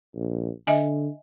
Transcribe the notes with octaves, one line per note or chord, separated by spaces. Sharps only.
A#1
D3 D#5 E5 G#5